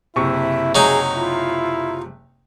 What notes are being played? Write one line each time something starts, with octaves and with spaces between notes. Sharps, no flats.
F#1 C3 E4 E5 C#6
F#3 D#4 G#4
E4 F4